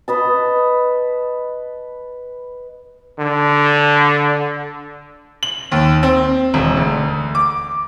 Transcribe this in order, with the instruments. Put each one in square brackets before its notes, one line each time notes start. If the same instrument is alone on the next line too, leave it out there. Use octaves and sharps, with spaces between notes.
[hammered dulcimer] B4 D#5 A5
[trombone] D3
[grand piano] F#7
D#2
C4
E1
D2
D6